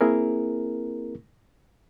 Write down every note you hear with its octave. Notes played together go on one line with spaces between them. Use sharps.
A#3 C4 E4 G#4 A#4